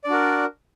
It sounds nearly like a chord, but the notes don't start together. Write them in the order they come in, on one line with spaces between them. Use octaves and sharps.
D5 D4 F#4 A#4